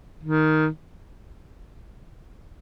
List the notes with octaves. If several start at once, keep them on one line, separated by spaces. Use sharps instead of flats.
D#3